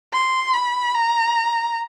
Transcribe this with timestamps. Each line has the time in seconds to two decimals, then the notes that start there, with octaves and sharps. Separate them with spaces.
0.13 C6
0.54 B5
0.94 A#5